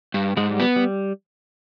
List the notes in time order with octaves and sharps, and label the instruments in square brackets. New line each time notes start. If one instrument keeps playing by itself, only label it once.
[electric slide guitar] G2
[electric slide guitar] G#2 [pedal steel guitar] G#3
[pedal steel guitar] G3
[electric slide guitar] B3
[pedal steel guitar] G3